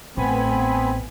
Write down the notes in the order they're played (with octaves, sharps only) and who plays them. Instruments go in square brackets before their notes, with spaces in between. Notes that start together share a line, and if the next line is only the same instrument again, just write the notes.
[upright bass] A1 [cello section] A2 [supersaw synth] B3 G#5 B5 [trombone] C4